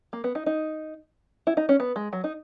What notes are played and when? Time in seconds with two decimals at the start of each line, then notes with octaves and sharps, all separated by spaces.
0.13 A#3
0.24 B3
0.35 D#4
0.46 D#4
1.47 E4
1.57 D#4
1.69 C#4
1.80 B3
1.96 G#3
2.13 F#3
2.24 D#4